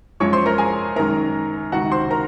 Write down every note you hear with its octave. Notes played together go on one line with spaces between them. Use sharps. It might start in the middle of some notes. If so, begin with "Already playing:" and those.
F#2 F3 G#3 C#5 C#6
C5 C6
A#4 A#5
G#4 G#5
F#2 D#3 G#3 A#4 A#5
C#2 C3 D#3 F#4 F#5
C5 C6
A#4 A#5